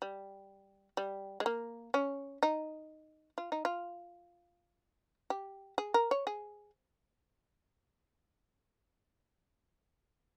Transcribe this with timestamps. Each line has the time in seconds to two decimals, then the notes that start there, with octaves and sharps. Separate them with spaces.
0.02 G3
0.97 G3
1.40 G#3
1.46 A#3
1.94 C#4
2.43 D#4
3.38 F4
3.52 D#4
3.65 F4
5.30 G4
5.78 G#4
5.94 A#4
6.11 C#5
6.27 G#4